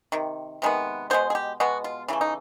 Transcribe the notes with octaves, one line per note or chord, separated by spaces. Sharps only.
C3 D#3
C3 D#3 G#3 B3
B2 G#3 B3 C5
G#4
G4
B2 G#3 B3 F#4
F4
C#3 E3 A3 E4
D#4